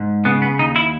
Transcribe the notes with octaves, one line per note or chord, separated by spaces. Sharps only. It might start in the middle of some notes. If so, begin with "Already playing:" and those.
Already playing: G#2
C#3 B3
B3
D#2 D#4
E4